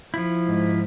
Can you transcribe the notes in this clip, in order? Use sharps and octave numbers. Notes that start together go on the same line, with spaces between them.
F3 E4
G#2